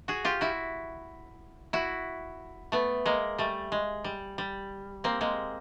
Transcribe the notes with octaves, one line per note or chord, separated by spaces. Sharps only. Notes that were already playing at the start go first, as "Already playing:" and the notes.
F#4 G#4
F4 G4
E4 F#4
E4 F#4
A3 B3
G#3 A#3
G3 A3
G#3
G3
G3
A#3 C4
G#3 A#3